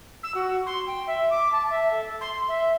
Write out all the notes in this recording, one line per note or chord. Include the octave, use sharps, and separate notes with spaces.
E6
F#4
C6
G5
E5
D6
A5
E5
A4
C6
E5